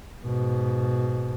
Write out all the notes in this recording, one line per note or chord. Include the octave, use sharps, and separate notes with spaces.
G#2 B2